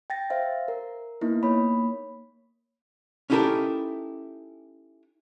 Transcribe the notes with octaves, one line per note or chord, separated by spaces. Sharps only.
G5 A6 A#6
C5 E5 F5
A#4
A#3 B3 D#4 E4
A#3 C#5 B5
C#4 D#4 E4 G4 A4 A#4